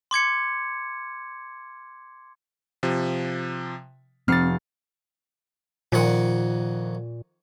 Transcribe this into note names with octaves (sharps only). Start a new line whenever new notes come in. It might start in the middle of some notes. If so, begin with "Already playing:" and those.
C6 D6 G#6 C#7
C3 F3
F1 C4 F6 A6 C7 C#7
F2 A#2 D#3 F#5